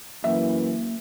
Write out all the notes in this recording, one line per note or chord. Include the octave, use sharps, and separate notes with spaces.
F#2 E3 A#3 E5